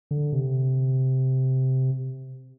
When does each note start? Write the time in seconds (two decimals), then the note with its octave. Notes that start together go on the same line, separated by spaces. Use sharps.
0.11 D3
0.32 C3